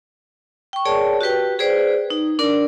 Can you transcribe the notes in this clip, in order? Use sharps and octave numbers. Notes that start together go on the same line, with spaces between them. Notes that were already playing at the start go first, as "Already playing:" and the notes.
G5 C#6
G#4 A#4 C#5 D5 G5 A5
F#4 G4 B4 G5
G#4 B4 C5 D5
D#4
D4 A#4 D5